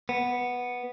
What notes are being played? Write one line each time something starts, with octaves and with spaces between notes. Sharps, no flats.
B3